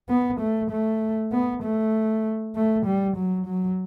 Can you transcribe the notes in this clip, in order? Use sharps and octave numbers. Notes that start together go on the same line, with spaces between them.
B3
A3
A3
B3
A3
A3
G3
F#3
F#3